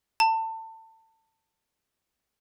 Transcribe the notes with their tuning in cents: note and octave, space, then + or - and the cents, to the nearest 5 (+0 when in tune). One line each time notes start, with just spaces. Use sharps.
A5 +25